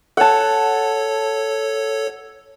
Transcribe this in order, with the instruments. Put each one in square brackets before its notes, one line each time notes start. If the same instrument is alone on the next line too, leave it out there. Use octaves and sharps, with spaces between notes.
[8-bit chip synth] A4 C#5 [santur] F#5 A5